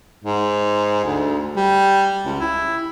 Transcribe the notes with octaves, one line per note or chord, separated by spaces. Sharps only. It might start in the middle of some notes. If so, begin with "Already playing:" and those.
G#2
D2
G3
C#2
E4